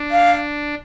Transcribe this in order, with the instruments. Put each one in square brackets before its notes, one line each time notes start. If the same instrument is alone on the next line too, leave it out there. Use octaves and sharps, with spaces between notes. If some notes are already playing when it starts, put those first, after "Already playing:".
Already playing: [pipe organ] D4
[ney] F5